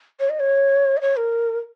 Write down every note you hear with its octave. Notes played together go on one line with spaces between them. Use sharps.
C#5
D#5
C#5
D#5
C#5
A#4